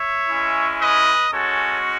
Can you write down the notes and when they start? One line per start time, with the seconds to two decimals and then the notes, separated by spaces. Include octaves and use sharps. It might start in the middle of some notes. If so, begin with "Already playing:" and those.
Already playing: C#5 E5
0.29 G#3 C#4 E4
0.81 B4 D#5
1.32 G#3 C#4 F#4 A4 C#5